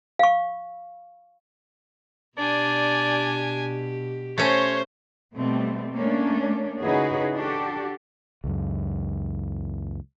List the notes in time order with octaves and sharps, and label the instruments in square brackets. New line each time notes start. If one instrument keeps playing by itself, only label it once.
[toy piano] F5 C#6
[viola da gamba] B2 G4 [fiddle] D4 G#5 [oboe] D5
[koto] A3 C#4 [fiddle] C5 C6 [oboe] C#5
[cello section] B2 G3 A3 C4
A3 A#3 C#4 D4
C#3 D#4 E4 F#4 G#4 B4
D4 F#4 G4 A4
[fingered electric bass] C#2 F#2